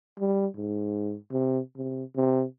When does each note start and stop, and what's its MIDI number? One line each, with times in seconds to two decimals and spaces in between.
0.19 0.47 55
0.56 1.16 44
1.32 1.60 48
1.77 2.04 48
2.16 2.44 48